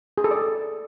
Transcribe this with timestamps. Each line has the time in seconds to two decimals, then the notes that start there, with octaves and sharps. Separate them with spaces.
0.18 G#4
0.24 A4
0.31 D5